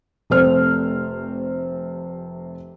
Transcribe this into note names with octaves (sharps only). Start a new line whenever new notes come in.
F1 C3 A3 C4 C5 F6